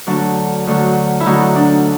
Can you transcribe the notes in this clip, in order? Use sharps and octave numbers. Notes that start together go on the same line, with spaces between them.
D2 D3 F#3 D4
D2 D3 F#3
E4
D2 D3 F#3 D#4
D4